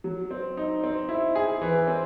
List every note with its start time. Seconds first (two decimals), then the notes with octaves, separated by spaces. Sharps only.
0.04 F#3
0.31 C4
0.57 D#4
0.83 C4
1.09 E4
1.35 G#4
1.61 E3
1.87 C4